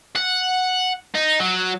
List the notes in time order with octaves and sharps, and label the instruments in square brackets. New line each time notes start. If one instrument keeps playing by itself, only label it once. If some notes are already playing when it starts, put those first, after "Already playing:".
[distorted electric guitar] F#5
D#4
F#3